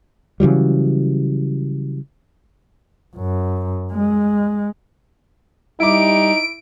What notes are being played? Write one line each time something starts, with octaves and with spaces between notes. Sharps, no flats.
C#3 E3 F#3 G3
F#2
G#3
G3 D#4 E4 D6 D7